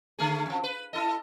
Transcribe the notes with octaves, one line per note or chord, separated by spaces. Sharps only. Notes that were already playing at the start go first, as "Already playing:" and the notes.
D3 A3 G#4
F2 F3
B4
E4 A4 D#5